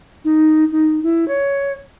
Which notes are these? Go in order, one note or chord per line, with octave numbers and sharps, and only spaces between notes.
D#4
D#4
E4
C#5